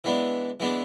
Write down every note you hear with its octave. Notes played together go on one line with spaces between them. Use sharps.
E3 G#3 B3 D4
E3 G#3 B3 D4